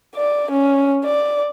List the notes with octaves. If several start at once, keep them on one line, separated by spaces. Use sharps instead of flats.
D5
C#4
D5